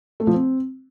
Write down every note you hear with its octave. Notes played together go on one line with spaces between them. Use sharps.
A3
F3
C4